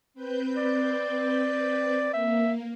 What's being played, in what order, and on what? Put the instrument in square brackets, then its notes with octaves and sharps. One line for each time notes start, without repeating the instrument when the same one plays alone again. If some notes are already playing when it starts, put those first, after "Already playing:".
[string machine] C4 B4 G6
[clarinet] D5
[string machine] A#3 [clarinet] E5